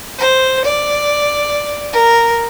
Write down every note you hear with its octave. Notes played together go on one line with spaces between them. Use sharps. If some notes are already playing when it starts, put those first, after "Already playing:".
C5
D5
A#4